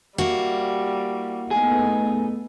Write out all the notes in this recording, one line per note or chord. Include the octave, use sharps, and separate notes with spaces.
G3 A#3 E4 F#4
A3 B3 D#4 G#4